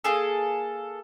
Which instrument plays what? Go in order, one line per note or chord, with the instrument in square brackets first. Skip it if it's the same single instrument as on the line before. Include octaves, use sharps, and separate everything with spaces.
[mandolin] A#3 G#4 A4